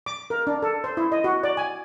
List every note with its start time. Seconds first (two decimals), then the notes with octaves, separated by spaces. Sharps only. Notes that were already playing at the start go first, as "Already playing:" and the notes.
0.06 D6
0.30 A#4
0.47 D4
0.62 A4
0.84 C5
0.97 E4
1.12 D#5
1.24 F#4
1.43 D5
1.57 G#5